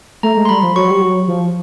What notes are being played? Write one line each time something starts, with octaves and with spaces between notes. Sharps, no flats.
A3 A#5
G#3
C6
G3 B5
F3
F#3 C#6
G3
F#3
F3